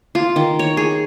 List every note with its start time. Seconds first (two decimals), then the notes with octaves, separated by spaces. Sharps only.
0.15 F4
0.36 D#3
0.59 C#5
0.77 G#4